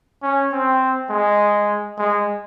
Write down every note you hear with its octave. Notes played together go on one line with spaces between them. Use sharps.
C#4
C4
G#3
G#3